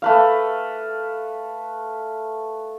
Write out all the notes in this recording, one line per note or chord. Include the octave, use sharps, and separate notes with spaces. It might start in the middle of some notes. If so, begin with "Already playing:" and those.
A3 B4 F5